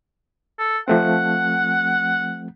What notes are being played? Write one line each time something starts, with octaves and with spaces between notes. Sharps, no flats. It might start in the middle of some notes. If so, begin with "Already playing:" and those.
A4
F3 A3 C4 F#5